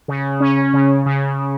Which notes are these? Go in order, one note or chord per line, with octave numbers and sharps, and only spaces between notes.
C#3
C#4
C#3
C#3